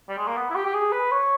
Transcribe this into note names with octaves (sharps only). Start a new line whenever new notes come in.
G3
G#3
A#3
B3
E4
G4
G4
G#4
B4
C#5